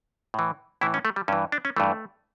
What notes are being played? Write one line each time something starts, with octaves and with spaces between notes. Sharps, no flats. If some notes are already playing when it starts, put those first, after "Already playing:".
A2 E3
A2 E3 E4
C#4
A3
G3
G2 E3 C#4
D4
C#4
G2 E3 A3